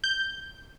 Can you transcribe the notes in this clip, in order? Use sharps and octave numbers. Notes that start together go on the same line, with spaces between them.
G6